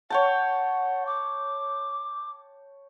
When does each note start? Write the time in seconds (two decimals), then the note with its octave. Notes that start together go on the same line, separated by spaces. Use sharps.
0.10 C#5 F#5 G5 A5
1.06 D6